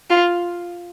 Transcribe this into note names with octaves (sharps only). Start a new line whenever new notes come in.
F4